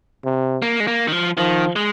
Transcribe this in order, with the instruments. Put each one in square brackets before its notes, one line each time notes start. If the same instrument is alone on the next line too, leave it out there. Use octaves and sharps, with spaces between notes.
[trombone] C3
[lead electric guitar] A#3
G#3
A#3
D#3
F3
[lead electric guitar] D#3 [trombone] F3
[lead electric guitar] G#3